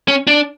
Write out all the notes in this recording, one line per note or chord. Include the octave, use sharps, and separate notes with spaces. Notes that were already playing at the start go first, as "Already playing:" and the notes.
C#4
D4